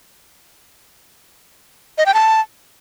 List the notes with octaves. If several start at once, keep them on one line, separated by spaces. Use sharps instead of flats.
D#5
G5
A5